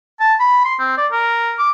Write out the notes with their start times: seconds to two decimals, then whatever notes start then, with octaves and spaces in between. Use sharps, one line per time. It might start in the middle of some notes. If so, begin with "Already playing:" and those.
0.20 A5
0.40 B5
0.65 C6
0.79 C4
0.98 D5
1.12 A#4
1.58 D6